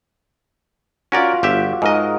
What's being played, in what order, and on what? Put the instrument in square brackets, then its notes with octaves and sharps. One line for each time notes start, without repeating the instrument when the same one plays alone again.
[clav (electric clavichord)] C#4 A#4 D5 [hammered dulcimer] F4 F#4
[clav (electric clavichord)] G1 G4 E5
[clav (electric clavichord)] G#2 D#5 [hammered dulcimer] G#3 A#4